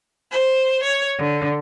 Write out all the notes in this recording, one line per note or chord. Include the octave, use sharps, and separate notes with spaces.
C5
C#5
D3